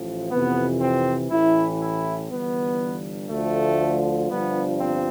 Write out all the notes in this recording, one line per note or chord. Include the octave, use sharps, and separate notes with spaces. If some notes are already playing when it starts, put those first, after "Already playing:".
Already playing: A1 A2 F3
F2 C3 E3 B3
C4
A1 A2 E3 E4
E4
G1 G2 E3 B3
D2 D3 F3 A3
G1 G2 F3 B3
C4